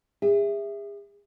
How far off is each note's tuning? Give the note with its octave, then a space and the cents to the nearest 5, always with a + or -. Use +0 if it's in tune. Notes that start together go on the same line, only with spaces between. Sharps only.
G#4 -40 E5 +0